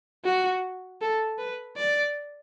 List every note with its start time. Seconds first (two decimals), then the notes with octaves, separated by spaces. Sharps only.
0.25 F#4
1.01 A4
1.38 B4
1.77 D5